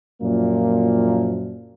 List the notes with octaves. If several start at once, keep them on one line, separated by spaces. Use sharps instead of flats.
F#2 A#2 F3 A#3